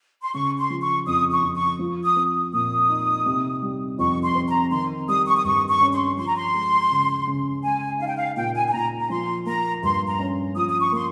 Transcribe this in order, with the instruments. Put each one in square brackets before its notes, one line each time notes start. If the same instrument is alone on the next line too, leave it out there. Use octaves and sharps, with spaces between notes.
[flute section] C6
[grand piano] C#3 [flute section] C#6
[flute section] C6
[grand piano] F3
[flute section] C#6
[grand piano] F2 [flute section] D#6
[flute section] C#6
[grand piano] F2
[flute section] C#6
[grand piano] F3
[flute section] D#6
[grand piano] C4
[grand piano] A#2 [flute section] D#6
[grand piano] D#4
C3
G3
[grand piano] F2 [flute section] C#6
[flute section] C6
[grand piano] C4
[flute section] A#5
[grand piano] D#3 [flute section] C6
[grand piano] G3 [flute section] D#6
[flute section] C#6
D#6
[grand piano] G2 [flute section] C#6
[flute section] C#6
[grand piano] C#4
[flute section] C6
[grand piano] F3 [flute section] C6
[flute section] A#5
C6
[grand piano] G#3
C#3
C#3
[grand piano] G#3 [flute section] G#5
[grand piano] D#4 [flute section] F5
[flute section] G5
F5
[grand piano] A#2 [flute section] G5
[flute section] G#5
G#5
[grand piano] A#2 [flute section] A#5
[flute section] A#5
[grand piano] F3 [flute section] C6
[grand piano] A#3 [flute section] A#5
[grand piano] G2 [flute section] C6
[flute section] A#5
[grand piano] C#4
[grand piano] F3 [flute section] D#6
[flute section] D#6
C#6
[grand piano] A#3 [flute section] C6